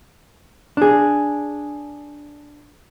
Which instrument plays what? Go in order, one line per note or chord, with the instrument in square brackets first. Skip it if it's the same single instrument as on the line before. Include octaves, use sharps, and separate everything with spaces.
[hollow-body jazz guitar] D4 G#4